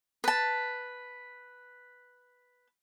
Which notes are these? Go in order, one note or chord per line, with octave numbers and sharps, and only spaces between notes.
B4 A5